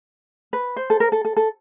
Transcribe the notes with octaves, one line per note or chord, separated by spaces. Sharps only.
B4
C5
A4
A#4
A4
A4
A4